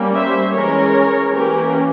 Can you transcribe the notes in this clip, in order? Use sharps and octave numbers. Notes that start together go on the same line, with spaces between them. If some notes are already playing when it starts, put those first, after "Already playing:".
Already playing: G3 A#3 C#4
C5 E5
E3 G#3 C#4 A#4 C#5
E3 A#3 C#4 G4 A#4